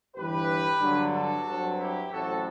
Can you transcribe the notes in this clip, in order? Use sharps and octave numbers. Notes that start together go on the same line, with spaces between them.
G1 G2 E3 G4 B4
G2 D3 F#3
F#4 A4
G2 F#3 C4
E4 G4
A1 A2 F#3 C4 F#4 A4